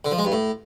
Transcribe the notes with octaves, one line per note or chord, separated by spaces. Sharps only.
D3
F3
G#3
G2
A2